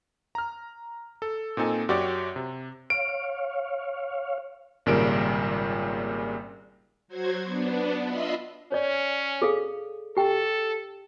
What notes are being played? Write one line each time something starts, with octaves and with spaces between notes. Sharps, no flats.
A#5 F6
A4
A#2 C4 D#4 A4 G#5
F#2 F#4 G4 C#5 D5 D6
C3
C#5 F5 D7
G#1 A#2 C#3 G3 A#4 D7
F#3 F#4 C5 G#6
B3 D4
F4 D#5 E5 B5 C6
C#4 C#5 D5
G#4 A4 F5
G4 A4 G5